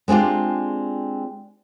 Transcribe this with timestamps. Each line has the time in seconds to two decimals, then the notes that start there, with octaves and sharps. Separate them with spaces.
0.08 G#3 C4 D4 F4 G4